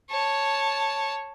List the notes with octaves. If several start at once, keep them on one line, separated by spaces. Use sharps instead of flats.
C#5 A5